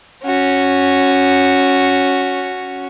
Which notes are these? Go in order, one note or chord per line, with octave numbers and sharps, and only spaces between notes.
C#4 F#4